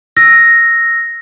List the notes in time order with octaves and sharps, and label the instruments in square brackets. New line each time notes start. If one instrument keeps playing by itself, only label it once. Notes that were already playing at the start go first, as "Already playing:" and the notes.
[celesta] E6 A#6